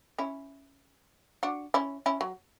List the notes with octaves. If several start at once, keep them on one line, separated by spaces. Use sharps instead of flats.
C#4 E4
D4 F#4
C#4 E4
C#4 E4
F#3